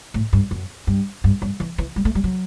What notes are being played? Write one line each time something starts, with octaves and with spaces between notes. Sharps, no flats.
A2
G2
F#2
G2
G2
G2
E3
E3
G3
A3
G3
F#3